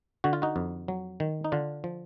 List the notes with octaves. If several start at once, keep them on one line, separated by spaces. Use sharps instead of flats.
D3 F#4
F4
D#4 F#4
F2
F#3
D#3
D#4
D3 D4 F4
F3